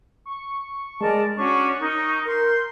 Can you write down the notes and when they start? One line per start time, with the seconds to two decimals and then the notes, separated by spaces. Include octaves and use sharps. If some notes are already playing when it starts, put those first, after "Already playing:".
0.26 C#6
1.01 G#3 A#4 D5 A5
1.37 C#4 D4 F#4 C#6
1.80 D#4 A#4
2.26 A#4 C6 G6